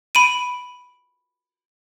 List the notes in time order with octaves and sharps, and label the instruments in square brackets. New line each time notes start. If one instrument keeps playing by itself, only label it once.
[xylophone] B5 D7 D#7